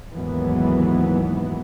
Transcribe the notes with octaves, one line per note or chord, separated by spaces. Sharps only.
D#2 G#2 E3 F#3 B3